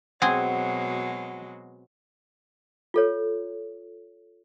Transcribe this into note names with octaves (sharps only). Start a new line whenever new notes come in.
B2 F#3 G#3 C4 G#4 F#5
F4 A4 C#5